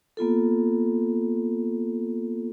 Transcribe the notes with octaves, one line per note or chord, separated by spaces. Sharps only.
A#3 B3 F4 A4